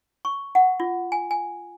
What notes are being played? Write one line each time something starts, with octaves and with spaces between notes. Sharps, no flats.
C#6
F#5
F4
G#5
G#5